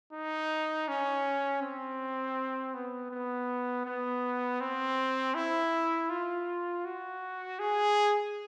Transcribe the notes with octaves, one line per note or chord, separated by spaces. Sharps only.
D#4
C#4
C4
B3
B3
B3
C4
E4
F4
F#4
G#4